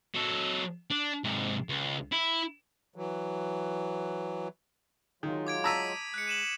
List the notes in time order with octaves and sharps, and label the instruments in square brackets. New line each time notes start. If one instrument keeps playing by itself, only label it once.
[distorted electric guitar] F#3 A4
D4
G#2 C3
C#2
E4
[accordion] E3 F#3
[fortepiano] D#3 [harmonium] F#3 G#3 F4
[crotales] D6 G#6 D7
[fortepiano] A5 A#5 E6 [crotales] D#6 B6 D#7
[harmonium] G#3 [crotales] F#6 C#7
[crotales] D#7 E7 F#7